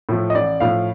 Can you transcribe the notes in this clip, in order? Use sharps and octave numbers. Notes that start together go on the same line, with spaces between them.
A2 F3 A3
D#5
A1 D5
A2 F3 A3 F5